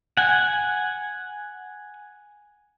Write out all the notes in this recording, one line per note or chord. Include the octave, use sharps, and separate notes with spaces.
F#5 G#5